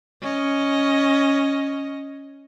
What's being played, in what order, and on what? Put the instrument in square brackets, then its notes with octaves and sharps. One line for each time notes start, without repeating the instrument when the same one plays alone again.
[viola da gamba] C#4 D#5